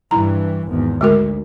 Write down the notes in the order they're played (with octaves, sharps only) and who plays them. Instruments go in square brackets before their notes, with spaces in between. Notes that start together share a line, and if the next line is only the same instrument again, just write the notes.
[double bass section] G2 E3 [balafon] E4 A#5
[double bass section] G#1 E2
[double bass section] D2 [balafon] G#3 F#4 A#4